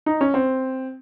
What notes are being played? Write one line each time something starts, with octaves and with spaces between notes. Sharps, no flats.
D#4
C#4
C4